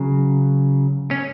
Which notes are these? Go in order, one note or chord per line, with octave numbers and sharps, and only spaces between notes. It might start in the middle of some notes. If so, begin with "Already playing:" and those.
Already playing: C#3 F#3
C#4